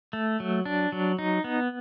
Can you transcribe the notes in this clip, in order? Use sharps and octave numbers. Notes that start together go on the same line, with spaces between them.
A3
F#3
D4
F#3
D#4
B3